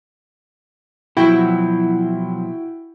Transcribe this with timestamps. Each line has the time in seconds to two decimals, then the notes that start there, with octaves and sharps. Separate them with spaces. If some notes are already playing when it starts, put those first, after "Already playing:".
1.17 B2 F3 F#3 E4 F#4 G5